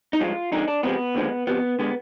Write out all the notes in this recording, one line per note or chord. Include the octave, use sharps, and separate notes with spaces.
D#4
G2 F3 G#3 F4
F2 D3 G#3 D#4
D4
F2 C3 F3 G#3 B3
D#2 D3 F3 G#3
F2 C3 F3 B3
D3 G#3 B3